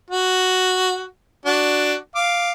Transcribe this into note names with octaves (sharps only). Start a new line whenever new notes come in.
F#4
D4 F#4
F5 D6